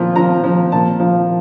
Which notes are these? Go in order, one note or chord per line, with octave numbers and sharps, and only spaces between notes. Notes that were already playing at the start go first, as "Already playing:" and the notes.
Already playing: A#2 F3
F3 A#5
F3
A#2 A5
F3